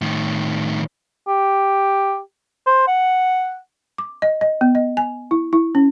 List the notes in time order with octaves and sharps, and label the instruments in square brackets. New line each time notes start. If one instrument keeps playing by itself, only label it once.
[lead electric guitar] A2 D#3
[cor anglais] G4
C5
F#5
[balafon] D6
D#5
D#5
B3
D#5
G#5
E4
E4
C#4